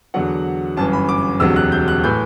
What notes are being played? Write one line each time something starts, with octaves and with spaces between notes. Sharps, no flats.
E2 D3 F#3 F#5
G1 F#2 E3 A5
B5
D6
E1 D2 C3 F#3 E6
F#6
G6
F#6
A2 E3 G6